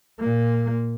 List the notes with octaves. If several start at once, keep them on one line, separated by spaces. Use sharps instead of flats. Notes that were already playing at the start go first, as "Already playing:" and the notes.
A#2 A#3